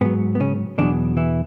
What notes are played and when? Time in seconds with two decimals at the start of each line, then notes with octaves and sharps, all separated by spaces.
0.01 G#2 F#3 B3
0.35 B3
0.40 C#3 C#4
0.78 E2 B2 D3 F#3 D4
1.17 E3 E4